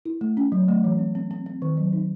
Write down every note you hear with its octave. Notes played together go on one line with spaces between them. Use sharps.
E4
A3
C#4
F#3
A3
E3
C4
C4
C4
C4
D#3
F#3
D#4